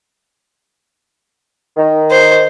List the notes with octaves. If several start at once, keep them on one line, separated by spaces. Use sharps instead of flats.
D#3
C5